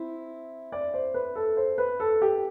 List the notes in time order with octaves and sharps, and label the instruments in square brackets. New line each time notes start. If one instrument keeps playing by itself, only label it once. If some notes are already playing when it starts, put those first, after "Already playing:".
Already playing: [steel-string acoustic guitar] C4 E4
[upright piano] D5
C5
B4
A4
C5
B4
A4
G4